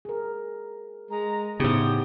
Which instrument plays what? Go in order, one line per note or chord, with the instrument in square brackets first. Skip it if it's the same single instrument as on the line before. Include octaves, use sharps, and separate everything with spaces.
[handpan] G#4 A#4
[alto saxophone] G#3 [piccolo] A#5
[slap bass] A2 C#3 [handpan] B3 D#4 C5 [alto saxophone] G4 [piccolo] D#6